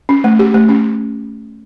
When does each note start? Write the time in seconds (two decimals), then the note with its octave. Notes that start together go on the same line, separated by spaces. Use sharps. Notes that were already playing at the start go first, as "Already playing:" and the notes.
0.09 C#4
0.24 A3
0.39 G4
0.54 A3
0.69 C#4